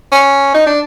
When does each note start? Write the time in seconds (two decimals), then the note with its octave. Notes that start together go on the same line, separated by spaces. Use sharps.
0.12 C#4
0.54 D#4
0.67 D4